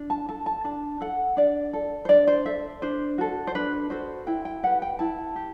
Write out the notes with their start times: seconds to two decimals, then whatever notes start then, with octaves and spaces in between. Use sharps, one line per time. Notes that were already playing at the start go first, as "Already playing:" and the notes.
Already playing: D4
0.10 A5
0.29 A4 A5
0.46 A5
0.64 D4 A5
1.01 A4 F#5
1.37 D4 D5
1.73 A4
2.05 C5
2.09 D4 D5
2.27 C5
2.46 A4 E5
2.82 D4 C5
3.18 F#4 A4
3.47 C5
3.55 D4 B4
3.90 F#4 A4 C5
4.27 E4 G5
4.45 G5
4.63 G4 B4 F#5
4.82 G5
4.99 E4 A5
5.36 G4